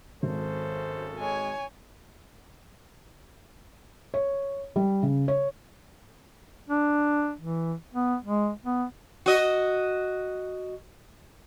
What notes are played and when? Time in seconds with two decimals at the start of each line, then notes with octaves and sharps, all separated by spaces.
0.23 G#1 F#2 C#3 A4 C5
1.19 G#3 C#5 G#5
4.14 C#5
4.76 G3
5.03 C#3
5.28 C#5
6.69 D4
7.40 E3
7.94 B3
8.24 G#3
8.65 B3
9.26 F#4 D#5